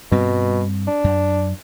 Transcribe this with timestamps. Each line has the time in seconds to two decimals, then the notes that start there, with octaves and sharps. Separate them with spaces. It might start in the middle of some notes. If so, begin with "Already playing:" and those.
0.12 G2 B2 G3 C4
0.87 D4
1.04 F#2